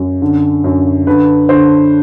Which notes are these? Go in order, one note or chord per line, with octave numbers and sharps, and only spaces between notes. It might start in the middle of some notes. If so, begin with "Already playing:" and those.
Already playing: F#2
D3
F#2
D3 B4
D3 C5